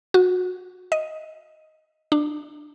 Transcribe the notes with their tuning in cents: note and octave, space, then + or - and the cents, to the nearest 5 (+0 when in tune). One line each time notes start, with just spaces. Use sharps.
F#4 -25
D#5 +5
D4 +25